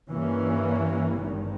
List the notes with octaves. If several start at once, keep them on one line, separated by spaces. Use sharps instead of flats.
G2 E3 A#3 C#4
G#1 G2 D#3